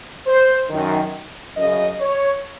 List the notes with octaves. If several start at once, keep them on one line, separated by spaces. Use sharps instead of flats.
C5
F#2 D#3
F#2 C#3 D#5
C#5